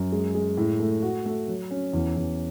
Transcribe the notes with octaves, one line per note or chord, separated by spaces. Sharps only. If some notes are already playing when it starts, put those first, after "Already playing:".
Already playing: F#2
G#3
G#3
A2
A3
F#4
A3
F#3
C#4
E2
E2